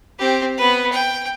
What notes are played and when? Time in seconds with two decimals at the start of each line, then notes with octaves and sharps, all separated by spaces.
0.19 C4 G4
0.58 B3 B4
0.92 G5